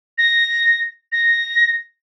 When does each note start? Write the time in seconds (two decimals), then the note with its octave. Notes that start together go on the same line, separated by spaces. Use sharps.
0.18 A#6
1.12 A#6